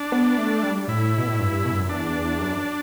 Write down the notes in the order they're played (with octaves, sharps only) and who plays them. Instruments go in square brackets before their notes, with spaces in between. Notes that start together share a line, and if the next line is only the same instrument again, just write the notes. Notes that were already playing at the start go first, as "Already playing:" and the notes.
Already playing: [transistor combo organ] D4
[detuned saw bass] B3
A3
G3
[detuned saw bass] A2 [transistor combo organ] E4
[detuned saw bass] B2
A2
G2
G2
B2
G2
F#2
[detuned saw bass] E2 [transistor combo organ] D4
[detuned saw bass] F#2